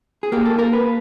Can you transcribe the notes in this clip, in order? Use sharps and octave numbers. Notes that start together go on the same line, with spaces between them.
G#4
A#3 G4
A4
A#3 A#4
B4